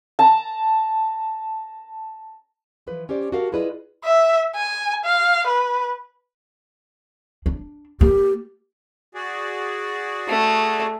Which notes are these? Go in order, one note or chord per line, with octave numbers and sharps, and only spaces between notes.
A5 A#5
E3 F3 B4
C#4 G4 C5 D5
F#4 G4 A4 A#4 F5
E4 F4 G#4 B4 D5 D#5
E5
G#5
F5
B4
D4
A#3 G4
F#4 G#4 D5
A3